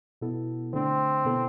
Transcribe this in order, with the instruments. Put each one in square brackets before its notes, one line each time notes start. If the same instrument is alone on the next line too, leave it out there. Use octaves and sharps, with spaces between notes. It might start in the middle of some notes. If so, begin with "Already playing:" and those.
[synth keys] B2 B3 E4 A4
[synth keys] D3 A3 D4 [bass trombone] C4
[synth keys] B2 B3 E4 A4